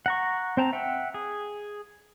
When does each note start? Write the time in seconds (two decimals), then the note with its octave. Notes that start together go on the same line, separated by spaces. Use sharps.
0.06 F#5 A#5 C#6
0.57 C4 C5 G5 A5 A#5
0.73 E5 F#5 G5
1.14 G#4